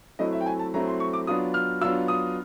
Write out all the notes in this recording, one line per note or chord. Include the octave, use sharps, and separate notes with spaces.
F#3 A3 C4 E4 D#5
E5
G5
G#5
A5
F#3 A3 C4 E4 A#5
C6
C#6
D6
F#3 B3 D4 F4 D#6
F6
F#3 B3 D4 F4 E6
D#6